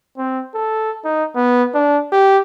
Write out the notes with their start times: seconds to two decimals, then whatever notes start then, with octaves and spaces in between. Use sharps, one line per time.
0.18 C4
0.55 A4
1.05 D#4
1.36 B3
1.74 D4
2.12 G4